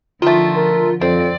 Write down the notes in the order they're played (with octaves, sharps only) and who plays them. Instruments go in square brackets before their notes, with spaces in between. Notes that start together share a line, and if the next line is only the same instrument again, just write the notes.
[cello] D3 F3 [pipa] D#3 A3 [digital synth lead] F4
[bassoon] A#4
[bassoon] F2 [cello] F3 D5 [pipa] C4